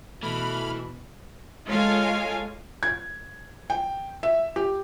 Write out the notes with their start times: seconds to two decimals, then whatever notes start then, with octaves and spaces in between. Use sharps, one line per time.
0.23 B2 E3 A3 B5 F6
1.67 G#3 F4 A4 C#5 F5 G#5
2.83 G#6
3.70 G5
4.23 E5
4.56 G4